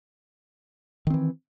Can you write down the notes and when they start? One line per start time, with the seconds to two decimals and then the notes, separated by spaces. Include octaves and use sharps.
1.07 D#3
1.10 C4
1.14 E3